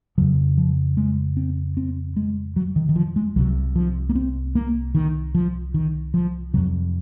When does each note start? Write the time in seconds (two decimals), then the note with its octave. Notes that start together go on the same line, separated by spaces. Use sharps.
0.18 F2 C#3 F#3
0.58 F3
0.97 G#3
1.37 C4
1.77 C4
2.17 G#3
2.56 F#3
2.76 D#3
2.89 D#3
2.96 F3
3.16 G#3
3.36 C2 C3 F#3
3.76 F3
4.09 A#3
4.15 C4
4.55 A#3
4.95 D#3
5.35 F3
5.74 D#3
6.14 F3
6.54 F2 C3 F#3